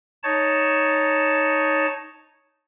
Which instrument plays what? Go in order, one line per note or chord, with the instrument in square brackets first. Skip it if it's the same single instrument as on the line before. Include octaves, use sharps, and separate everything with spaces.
[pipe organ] D#4 C#5 A5